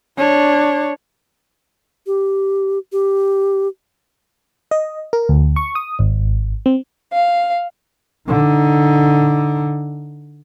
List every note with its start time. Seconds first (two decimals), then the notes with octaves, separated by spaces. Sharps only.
0.17 D4 C#5
2.07 G4
2.92 G4
4.71 D#5
5.13 A#4
5.29 D2
5.56 C#6
5.75 D#6
5.99 G#1
6.66 C4
7.13 F5
8.28 D3 D#4